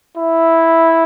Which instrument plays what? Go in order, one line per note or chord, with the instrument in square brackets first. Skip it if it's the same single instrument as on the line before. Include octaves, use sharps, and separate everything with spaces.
[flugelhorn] E4